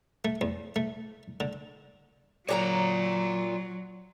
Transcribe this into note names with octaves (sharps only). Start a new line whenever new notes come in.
A3
E2
A3
D3
A#2 F#3 F4 G#4 C#5 A#5